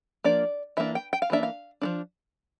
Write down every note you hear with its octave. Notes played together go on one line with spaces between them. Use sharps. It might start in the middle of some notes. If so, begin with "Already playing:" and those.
F3 A#3 D4 D5
E3 A#3 D4 E5
G5
G5
F5
E3 A#3 D4 E5
F5
F3 A3 D4